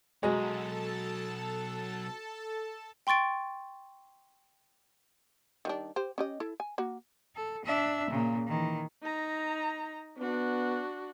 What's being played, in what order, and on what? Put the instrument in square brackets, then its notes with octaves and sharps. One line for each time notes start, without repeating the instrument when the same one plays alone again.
[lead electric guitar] B1 [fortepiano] G#3 [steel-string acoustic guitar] F#4 A#5 [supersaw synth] A4 A5
[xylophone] G5 C6 C#6 A6 D7
[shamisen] D#3 G3 D4
G4 C5
C#4 G4 D#5
E4 A4
G#5
A#3 F#4
[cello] A4
D4 E5
A#2 C#3
D#3 E3
[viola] D#4 A#5
[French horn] B3 [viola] D4 F#4